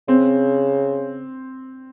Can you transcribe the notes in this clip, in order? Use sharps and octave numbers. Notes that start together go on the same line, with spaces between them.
C#3 C4